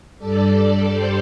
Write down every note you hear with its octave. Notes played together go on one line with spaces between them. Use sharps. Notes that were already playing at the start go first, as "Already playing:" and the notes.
G2 G3 A4 D5
G4 C5